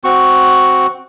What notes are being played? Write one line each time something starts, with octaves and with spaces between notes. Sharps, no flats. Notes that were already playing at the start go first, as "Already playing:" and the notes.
C4 F#4 C#6